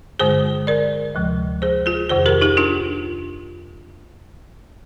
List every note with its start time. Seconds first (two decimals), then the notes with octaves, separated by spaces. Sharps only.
0.19 G2 D3 G#3 G#4 C5
0.67 A#4 D5
1.15 D2 C3 F3 G#3
1.62 G#4 C5
1.86 F4 G#4
2.09 F2 C3 D#3 G#4 C5
2.26 G4 A#4
2.41 D#4 G4
2.57 D4 F4